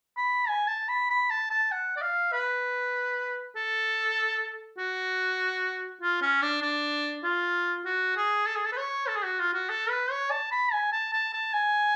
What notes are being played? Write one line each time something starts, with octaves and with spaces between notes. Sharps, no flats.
B5
G#5
A5
B5
B5
A5
A5
F#5
D5
F5
B4
A4
F#4
F4
C#4
D4
D4
F4
F#4
G#4
A4
G#4
A4
B4
C#5
A4
G#4
F#4
F4
F#4
A4
B4
C#5
A5
B5
G#5
A5
A5
A5
G#5